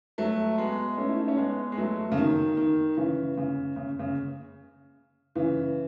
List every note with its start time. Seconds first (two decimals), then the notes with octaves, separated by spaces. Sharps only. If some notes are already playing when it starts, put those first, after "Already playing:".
0.18 F#3 A3
0.58 G#3 B3
0.98 A3 C#4
1.08 E4
1.18 D#4
1.28 C#4
1.37 G#3 B3
1.72 G#3
1.78 F#3 A3
2.12 C#3
2.17 D#3
2.57 D#3
2.97 C#3 E3
3.37 C#3
3.76 C#3
3.99 C#3
5.35 C#3 E3